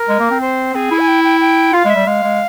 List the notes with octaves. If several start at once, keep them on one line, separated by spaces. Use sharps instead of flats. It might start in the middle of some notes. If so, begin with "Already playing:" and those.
Already playing: A#4
G#3
A#3
C4
C5
C4 G#4
E4
G#5
G5
G5
G5
F4 F5
G#3 E5
G3
G#3 F5
G#3